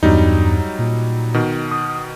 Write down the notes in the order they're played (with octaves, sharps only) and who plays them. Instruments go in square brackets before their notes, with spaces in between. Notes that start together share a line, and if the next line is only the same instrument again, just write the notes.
[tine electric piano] E2 G2 [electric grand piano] F#3 G3 D#4
[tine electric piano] A#2
[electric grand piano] B2 D#3
[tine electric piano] D#6